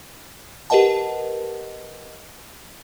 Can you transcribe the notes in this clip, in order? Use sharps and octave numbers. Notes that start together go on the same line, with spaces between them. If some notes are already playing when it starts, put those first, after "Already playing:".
G4 A#4 B4 D#5 F#5 A5